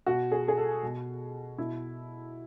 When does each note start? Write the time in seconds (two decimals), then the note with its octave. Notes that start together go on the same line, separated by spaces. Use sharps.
0.06 B2 F#4
0.32 G#4
0.48 G#4
0.57 A4
0.83 B2
1.58 B2 E4